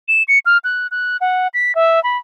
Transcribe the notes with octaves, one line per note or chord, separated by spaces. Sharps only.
E7
C#7
F6
F#6
F#6
F#5
B6
E5
B5